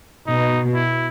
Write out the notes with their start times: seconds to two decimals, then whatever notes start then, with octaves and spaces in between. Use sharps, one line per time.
0.27 B2 D#4
0.74 E4